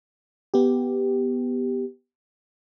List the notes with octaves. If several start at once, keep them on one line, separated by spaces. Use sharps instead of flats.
B3 G4